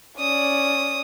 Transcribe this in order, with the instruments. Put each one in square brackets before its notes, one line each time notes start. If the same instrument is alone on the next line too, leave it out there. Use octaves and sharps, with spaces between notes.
[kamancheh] C#4 D5 [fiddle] D#6